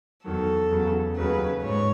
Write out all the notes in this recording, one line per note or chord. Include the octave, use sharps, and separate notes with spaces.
E2 D#3 F#3 A4
E2 C#3 F#3
D#2 C#3 F#3 B4
G#2 C#5